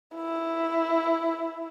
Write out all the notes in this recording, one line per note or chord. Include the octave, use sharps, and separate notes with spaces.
E4